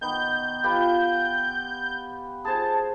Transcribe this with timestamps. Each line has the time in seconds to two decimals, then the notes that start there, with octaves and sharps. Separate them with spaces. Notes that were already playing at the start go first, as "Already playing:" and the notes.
0.01 D#3 B3 G6
0.63 F4 G4 B4
2.45 G#4 C5 A5